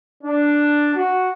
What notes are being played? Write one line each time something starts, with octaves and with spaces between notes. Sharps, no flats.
D4
F#4